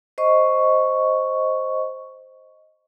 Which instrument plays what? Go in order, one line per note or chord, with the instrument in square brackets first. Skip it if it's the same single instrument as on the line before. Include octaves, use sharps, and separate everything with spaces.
[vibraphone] C5 D#5 C#6